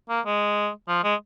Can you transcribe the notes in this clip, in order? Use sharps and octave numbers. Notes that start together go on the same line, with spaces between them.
A#3
G#3
F3
G#3